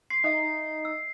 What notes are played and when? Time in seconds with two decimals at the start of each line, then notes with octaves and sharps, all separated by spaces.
0.10 C6 C7
0.24 D#4 D#5 E5
0.85 E6